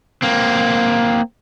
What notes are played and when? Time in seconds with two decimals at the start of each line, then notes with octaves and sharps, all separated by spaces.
0.22 A#3 C4